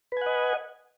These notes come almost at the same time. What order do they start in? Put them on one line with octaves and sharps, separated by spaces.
B4 G#5 F#5 D#5